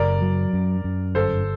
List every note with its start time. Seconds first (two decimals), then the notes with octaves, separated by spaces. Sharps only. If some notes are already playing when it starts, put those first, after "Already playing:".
Already playing: F#1 A#4 D5
0.22 F#3
0.53 F#2
0.84 F#2
1.15 G1 A4 C5